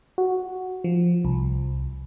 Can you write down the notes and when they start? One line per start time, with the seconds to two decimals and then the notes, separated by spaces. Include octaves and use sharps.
0.18 F#4
0.84 F3
1.25 C2